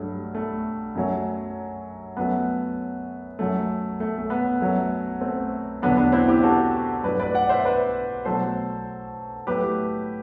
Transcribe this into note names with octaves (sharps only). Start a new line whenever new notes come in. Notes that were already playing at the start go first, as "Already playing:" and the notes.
Already playing: G2 F#3 A3
A3
F#2 F#3 A3
F#2 F#3 A3 B3
F#2 F#3 A3
A3
A3
B3
F#2 F#3 A3
A3 C4
E2 D3 F#3 A3 B3 D4
B3 D4
C4 E4
E4 G4
F#4 A4
G2 F#3 A3 B4 D5
B4 D5
D5 F#5
C5 E5
B4 D5
B2 F#3 A3 A4 C5
A2 F#3 A3 G4 B4